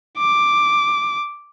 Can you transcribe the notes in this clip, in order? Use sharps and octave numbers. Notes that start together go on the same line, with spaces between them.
D6